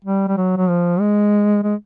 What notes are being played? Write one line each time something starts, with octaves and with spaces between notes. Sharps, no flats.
G3
G3
F#3
F#3
F3
G#3
G#3